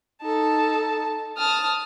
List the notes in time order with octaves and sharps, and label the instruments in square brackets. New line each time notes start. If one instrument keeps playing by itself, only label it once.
[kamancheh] D#4 A4 [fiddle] A5
[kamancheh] A5 [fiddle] D#6 F6